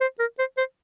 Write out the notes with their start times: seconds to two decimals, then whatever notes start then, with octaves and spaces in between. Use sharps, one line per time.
0.01 C5
0.19 A#4
0.39 C5
0.58 C5